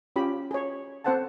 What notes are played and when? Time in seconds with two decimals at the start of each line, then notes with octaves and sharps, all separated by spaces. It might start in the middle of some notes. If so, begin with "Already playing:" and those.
0.16 C#4 F4 G4 B5
0.51 G#4 C#5
1.04 C4 A4 C5 F#5 G5 A5